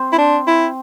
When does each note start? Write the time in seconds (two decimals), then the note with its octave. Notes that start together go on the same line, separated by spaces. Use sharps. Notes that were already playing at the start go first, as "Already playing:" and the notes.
Already playing: C4 C5
0.12 E4
0.18 D4
0.47 E4